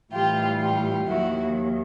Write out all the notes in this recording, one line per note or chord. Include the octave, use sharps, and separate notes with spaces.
A2 E3 G3 F4 G4
F4 G4
D#2 D#3 F#3 E4 F#4